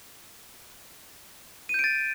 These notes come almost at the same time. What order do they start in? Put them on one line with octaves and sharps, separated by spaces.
D#7 G6 D7 A6